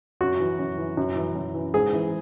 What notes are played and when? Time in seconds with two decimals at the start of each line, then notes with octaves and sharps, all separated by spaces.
0.21 F#2 F#4
0.40 E3
0.59 F#2
0.78 E3
0.97 F#2
1.16 E3
1.36 F#2
1.54 E3
1.74 G#2 G#4
1.93 E3